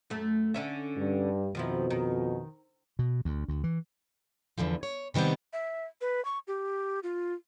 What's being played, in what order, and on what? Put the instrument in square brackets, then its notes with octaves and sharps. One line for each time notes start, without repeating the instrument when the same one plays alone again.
[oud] F#2 A3
D3 C#4 E5
[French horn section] G2
[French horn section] F2 B2 [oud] D#3 F3 E4
[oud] D#3
[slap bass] B2
D2
D2
E3
[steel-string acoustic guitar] E2 D3 E3 F3
C#5
C3 D#3 G3 B3 C4
[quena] E5
B4
C#6
G4
F4